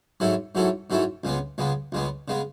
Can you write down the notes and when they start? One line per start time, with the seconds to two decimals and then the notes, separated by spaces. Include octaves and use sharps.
0.20 G#2 F#3 C#4 E4 A4
0.55 G#2 F#3 C#4 E4 A4
0.90 G#2 F#3 C#4 E4 A4
1.24 C#2 C#3 G#3 B3
1.58 C#2 C#3 G#3 B3
1.92 C#2 C#3 G#3 B3
2.28 C#3 G#3 B3